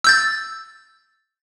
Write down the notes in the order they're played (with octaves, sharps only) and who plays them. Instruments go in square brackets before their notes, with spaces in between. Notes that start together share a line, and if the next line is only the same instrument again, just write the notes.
[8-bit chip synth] E6 G6 A6